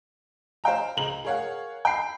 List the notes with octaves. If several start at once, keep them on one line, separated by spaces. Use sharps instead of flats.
C5 F5 G5 A#5
C#2 A#5 F#7
G#4 A#4 C#5 F5 F#5
G5 B5 C7